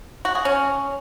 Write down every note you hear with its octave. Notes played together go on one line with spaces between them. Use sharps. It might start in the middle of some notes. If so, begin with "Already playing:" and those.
F#4
G#4
C#4